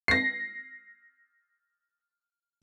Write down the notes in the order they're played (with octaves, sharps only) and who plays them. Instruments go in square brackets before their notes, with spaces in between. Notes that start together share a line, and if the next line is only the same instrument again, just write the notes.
[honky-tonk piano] A#6 C7